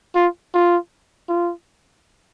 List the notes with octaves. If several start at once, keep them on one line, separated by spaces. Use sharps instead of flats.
F4
F4
F4